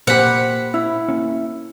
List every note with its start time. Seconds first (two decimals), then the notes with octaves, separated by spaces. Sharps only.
0.07 A#2 G4 C5 F#5 B5
0.74 E4
1.08 A#3 C#4